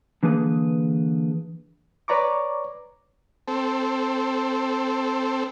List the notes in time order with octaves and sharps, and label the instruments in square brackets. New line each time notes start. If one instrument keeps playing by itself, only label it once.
[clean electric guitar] D3 E3 A#3 G#4 B4
[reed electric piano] B4 C#5 D5 A#5 C#6 D6
[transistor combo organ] C4 A4